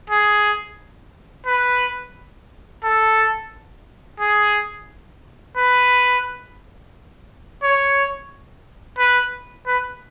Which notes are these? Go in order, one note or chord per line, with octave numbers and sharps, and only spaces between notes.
G#4
B4
A4
G#4
B4
C#5
B4
B4